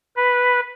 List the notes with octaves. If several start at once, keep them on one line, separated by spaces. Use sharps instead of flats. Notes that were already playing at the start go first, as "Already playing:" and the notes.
B4